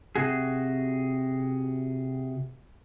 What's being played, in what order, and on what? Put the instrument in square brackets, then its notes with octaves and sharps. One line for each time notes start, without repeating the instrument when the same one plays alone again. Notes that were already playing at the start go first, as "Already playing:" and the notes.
[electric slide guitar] C3 F#4 G#4